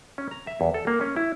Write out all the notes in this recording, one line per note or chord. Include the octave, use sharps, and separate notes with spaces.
C#4
A#5
E5
E2
A4
A#3
C#4
E4